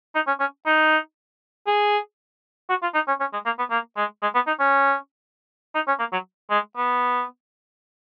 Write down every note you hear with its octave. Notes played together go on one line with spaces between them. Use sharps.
D#4
C#4
C#4
D#4
G#4
F#4
F4
D#4
C#4
C#4
G#3
A#3
B3
A#3
G#3
G#3
B3
D#4
C#4
D#4
C#4
A#3
F#3
G#3
B3